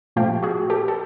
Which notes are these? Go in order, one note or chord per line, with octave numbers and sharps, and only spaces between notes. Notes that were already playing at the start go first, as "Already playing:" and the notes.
A#2 F3 A3 F4 G4
F#4 G#4
G4 A4
A4